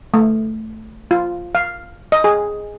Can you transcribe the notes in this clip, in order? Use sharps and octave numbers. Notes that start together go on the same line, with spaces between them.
A3
F4
F5
D#5
G#4